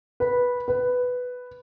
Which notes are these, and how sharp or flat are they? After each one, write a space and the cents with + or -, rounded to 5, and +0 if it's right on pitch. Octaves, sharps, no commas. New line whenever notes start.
B4 -10
B4 +5